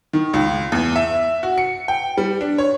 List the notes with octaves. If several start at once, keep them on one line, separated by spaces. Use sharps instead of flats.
D#3
C#2
E2
E5
F#4
C#7
G5
G3
D4
C#5